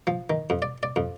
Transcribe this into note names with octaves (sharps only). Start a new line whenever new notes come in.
F3
D#3
F2
D5
D5
F2